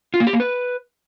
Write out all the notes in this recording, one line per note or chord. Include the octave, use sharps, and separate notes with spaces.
F4
A#3
G4
A#3
B4